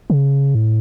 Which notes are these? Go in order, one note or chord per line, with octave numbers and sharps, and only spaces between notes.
C#3
A2